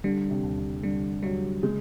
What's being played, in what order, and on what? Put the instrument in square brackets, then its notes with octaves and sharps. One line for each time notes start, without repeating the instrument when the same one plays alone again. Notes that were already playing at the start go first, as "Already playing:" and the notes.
[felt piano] D3 [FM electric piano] G3
[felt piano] C3
[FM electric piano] D#2
[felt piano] C3
[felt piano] D3 [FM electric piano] G3
[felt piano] F#3 [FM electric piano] G3
[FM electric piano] C#3 [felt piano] G#3